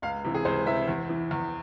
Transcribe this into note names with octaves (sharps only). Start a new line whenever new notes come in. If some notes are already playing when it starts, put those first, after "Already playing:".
C#2 F5
C3 E3
G#4
C#2 C5
C3 E3 E5
E2
E3
E2